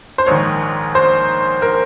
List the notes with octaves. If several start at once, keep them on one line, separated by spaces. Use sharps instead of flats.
C5
A#1 G#2 D#3 C#5
C5
A#4